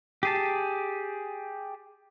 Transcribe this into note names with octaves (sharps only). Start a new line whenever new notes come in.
G4 G#4 A5